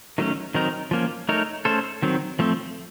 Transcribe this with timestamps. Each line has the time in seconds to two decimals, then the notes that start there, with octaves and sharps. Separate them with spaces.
0.18 D#3 F#3 A3 C#4
0.55 D#3 F#3 C4 D#4 A#4
0.91 F3 A#3 C#4
1.29 A3 D#4 A#4 C#5
1.65 A3 C#4 A4 C5
2.02 D#3 F#3 C4
2.39 F3 A3 C4